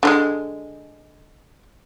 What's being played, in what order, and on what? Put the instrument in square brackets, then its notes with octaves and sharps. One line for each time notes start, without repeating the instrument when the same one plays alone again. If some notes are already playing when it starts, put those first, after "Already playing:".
[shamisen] D3 G3 G#3